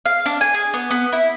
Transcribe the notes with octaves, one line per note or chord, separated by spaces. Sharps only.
F5
D4
G#5
G#4
B3
B3
E4